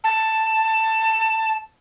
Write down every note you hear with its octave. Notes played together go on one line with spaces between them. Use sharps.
A5